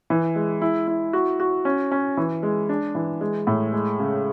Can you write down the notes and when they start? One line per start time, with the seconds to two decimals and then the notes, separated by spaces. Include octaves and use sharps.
0.10 E3
0.36 G#3
0.62 E4
0.88 E4
1.13 F#4
1.40 F#4
1.65 C#4
1.91 C#4
2.17 E3
2.43 G#3
2.69 D4
2.95 E3
3.21 G#3
3.47 A2
3.73 G#3
3.99 C#3